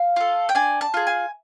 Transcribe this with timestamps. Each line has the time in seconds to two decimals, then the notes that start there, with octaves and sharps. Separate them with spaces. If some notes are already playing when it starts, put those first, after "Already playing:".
Already playing: F5
0.16 F4 A4
0.49 G5
0.55 D4 G#5
0.81 A5
0.94 F4 G#4
1.07 G#5